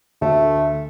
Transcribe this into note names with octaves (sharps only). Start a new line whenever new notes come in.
D2 A3 E5